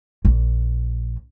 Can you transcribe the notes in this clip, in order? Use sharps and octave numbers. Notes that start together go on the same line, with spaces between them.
A#1